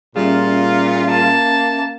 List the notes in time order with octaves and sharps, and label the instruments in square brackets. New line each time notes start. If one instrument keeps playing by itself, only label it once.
[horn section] A#2 F4 [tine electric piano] G3 G#4 [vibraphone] C#4 E5
[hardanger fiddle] A#3 A5